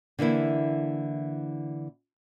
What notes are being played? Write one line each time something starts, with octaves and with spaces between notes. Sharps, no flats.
D3 E3 A#3 E4